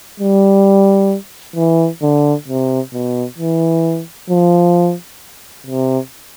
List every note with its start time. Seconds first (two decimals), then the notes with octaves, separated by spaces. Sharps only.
0.20 G3
1.56 E3
2.02 D3
2.48 C3
2.93 B2
3.38 E3
4.30 F3
5.67 C3